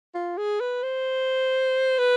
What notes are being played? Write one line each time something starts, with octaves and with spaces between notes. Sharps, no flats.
F4
G#4
B4
C5
B4